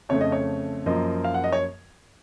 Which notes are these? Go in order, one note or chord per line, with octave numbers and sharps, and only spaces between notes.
F2 C#3 A3 C#5
D#5
C#5
F#2 F3 A#3 D#5
F5
F#5
D#5
C#5